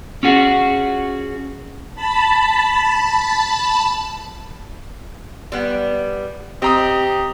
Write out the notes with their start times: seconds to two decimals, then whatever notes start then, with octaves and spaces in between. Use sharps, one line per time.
0.23 C#4 F4 F#4 G#4
1.95 A5 B5
5.52 G3 B3
6.62 C4 G4 D#5 A#5 D#6